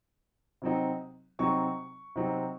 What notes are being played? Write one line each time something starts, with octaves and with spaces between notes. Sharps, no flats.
C3 F#3 C4 D#4
C3 F#3 C4 D#4 C#6
C3 F#3 C4 D#4